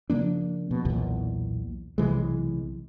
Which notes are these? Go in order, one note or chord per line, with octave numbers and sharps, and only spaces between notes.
C#3 F3 A#3 D4
B2
B1 E2 A#2
B1 C3 E3 G#3